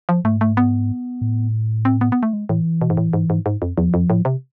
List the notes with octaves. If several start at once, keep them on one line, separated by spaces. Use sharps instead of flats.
F3
G#2 A3
A3
B3
A2
C4
B3
B3
A3
G#3
A2 E3
B2
G#2
A2
G#2
G#2
G#2
F2
E2 F3
F2
A2
C3